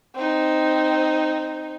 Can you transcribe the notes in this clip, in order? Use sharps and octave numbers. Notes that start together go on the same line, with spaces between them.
C4 D#4